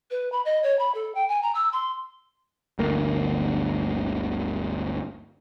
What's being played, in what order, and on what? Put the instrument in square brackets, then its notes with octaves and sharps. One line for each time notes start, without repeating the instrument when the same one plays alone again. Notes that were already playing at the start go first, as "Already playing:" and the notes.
[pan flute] B4
B5
D#5
C#5
B5
A4
G5
G#5
A#5
E6
C6
[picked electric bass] G1 D2 A#3